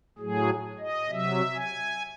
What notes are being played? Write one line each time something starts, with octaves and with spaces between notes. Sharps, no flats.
A2 F#3 G#4
D#5
C3 F#3 E5
G#5